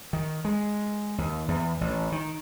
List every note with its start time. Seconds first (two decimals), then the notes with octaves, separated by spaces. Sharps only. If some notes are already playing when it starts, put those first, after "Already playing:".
0.13 D#3
0.45 G#3
1.18 D#2
1.48 E2
1.81 A1
2.12 D#3